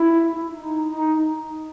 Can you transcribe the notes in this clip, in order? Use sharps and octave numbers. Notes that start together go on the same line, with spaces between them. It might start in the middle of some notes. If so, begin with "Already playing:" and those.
Already playing: E4
D#4
D#4